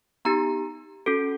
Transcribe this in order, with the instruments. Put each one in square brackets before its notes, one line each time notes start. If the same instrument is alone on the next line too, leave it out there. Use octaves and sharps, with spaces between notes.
[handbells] B3 D#4 G4 A#5
C#4 F#4 A4